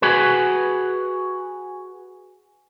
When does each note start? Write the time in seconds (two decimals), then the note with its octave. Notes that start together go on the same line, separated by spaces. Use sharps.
0.02 F#4 G#4 B4